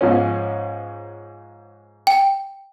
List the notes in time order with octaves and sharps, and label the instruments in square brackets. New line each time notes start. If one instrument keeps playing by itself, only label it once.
[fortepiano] G#2 F3 C#4
[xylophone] G5